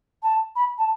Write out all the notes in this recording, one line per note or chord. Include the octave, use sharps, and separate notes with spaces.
A5
B5
A5